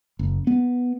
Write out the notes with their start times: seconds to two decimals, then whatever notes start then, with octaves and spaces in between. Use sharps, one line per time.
0.19 F#1
0.47 B3